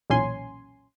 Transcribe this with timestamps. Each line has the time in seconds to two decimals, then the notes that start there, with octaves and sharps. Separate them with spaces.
0.10 B1 E2 A#2 C#4 G#5 C6